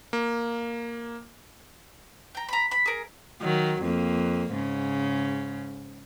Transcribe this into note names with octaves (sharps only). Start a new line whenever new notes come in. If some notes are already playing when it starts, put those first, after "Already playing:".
A#3
G5 A#5
A#5 B5
B5
G#4 A#4
D#3 F#3
F2 A#3
G#2 C#3